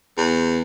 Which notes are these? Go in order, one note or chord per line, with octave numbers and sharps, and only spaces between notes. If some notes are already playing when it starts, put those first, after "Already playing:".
E2